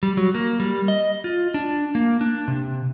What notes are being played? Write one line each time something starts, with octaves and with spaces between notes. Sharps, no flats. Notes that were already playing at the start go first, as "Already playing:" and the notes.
G3
F#3
A#3
G3
D#5
F4
D4
A#3
D4
C3